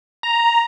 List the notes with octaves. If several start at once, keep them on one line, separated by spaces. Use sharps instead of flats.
A#5